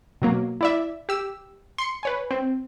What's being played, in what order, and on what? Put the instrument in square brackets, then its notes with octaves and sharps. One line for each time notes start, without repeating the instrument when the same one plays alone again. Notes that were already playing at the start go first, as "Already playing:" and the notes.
[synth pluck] B2 F#3 A#3
E4 D5 E5
G4 E6
C6 C#7
B4 C#5 G#5
C4